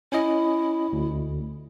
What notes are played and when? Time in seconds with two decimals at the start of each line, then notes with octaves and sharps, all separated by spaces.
0.12 C#4 E4 D#5
0.93 D2